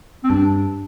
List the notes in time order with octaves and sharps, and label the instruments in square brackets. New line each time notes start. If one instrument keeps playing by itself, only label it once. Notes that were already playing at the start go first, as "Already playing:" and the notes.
[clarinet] C4
[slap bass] G2 [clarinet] D4